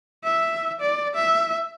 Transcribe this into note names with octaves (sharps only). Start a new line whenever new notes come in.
E5
D5
E5